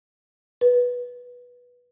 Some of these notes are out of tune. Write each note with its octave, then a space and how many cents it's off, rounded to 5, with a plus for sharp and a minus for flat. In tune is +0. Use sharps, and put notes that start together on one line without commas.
B4 -15